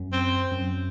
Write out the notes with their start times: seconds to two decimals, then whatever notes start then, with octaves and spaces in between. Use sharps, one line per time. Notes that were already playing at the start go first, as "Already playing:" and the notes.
Already playing: F#2
0.12 C4
0.51 F#2